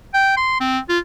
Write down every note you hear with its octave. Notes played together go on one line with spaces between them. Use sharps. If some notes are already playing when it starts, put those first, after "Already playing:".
G5
C6
C4
F4